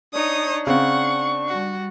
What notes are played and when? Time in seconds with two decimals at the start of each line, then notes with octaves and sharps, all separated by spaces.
0.14 D4 D#4 C#5 D#6
0.67 C#3 C4 F#5 C#6
1.50 G3 F#4